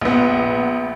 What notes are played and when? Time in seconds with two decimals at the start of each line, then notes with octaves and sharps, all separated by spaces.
0.01 A#1 B3